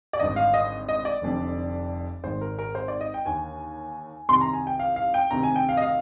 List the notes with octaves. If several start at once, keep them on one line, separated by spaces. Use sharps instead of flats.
D5
G#1 G2 D3 D#5
F5
D#5
D#5
D5
F1 F2 D3
G#1 G#2 D#3 C5
A#4
A#4
C5
D5
D#5
G5
D#2 D3 G#5
C2 C3 D#3 C6
A#5
G#5
G5
F5
F5
G5
D2 C3 D#3 A#5
G#5
G5
F5
D#5
F5